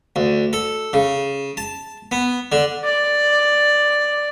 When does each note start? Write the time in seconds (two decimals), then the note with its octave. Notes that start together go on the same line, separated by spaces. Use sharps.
0.16 D2
0.53 A4
0.93 C#3
1.57 A5
2.11 B3
2.52 D3
2.84 D5